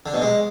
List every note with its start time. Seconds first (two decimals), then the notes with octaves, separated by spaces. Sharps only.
0.06 D3
0.14 B2
0.22 G#3